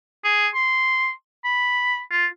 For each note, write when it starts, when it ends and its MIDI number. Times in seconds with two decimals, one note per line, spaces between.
0.24 0.48 68
0.55 1.10 84
1.45 2.00 83
2.11 2.27 65